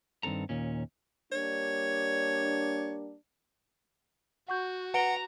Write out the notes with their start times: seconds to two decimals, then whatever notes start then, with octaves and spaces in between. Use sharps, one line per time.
0.23 G2 D#3 C4 A4 A#5
0.49 D#2 A#2 C#4
1.32 G3 A#3 D4 C#5
4.48 F#4 F#5 C#6 G6
4.94 B4 F#5 A#5 D7 G7